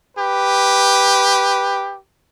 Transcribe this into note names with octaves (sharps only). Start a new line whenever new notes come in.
G4 B4